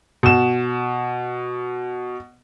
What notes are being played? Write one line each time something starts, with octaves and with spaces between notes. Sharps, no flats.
B2 E7